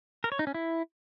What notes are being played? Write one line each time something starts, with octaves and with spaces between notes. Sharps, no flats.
A#4
C#5
D#4
C#4
E4